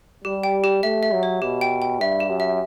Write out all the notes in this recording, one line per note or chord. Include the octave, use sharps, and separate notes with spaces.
G3 G4
G5
G4
A3 E5
E5
F#3
C#5
B2 G4
G5
G5
G2 E5
G4
F#2
E5